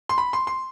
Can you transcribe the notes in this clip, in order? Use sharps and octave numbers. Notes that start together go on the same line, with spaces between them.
C6
B5
C6
C6